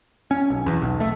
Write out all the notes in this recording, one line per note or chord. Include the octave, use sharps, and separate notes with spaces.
C#4
B1
E2
B1
A3